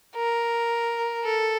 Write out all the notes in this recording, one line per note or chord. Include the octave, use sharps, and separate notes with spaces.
A#4
A4